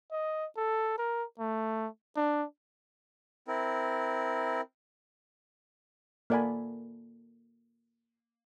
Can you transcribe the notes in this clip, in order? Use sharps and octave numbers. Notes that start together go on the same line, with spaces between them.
D#5
A4
A#4
A3
D4
C4 E4 A#4
A#3 A4 D5 F#5 G#5 B5